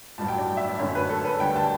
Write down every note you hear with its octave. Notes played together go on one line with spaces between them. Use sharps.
A1 G2 F#3 A5
G5
D5
E5
D5
F#2 D3 A3 C#4 C#5
B4
A4
B4
D2 D3 G3 G5
A5